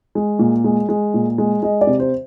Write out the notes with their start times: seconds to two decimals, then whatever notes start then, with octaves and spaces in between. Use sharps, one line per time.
0.15 G#3
0.39 A#2
0.64 G#3
0.89 G#3
1.14 A#2
1.38 G#3
1.63 G#3 D#5
1.81 D5
1.87 C3
2.00 C5